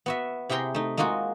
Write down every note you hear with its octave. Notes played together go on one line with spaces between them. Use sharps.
B3 F#4 E5
C3 E4 G#4 G5 A#5 C6
A3 D#4
G#3 A#3 D#4 F4 F#4 G#4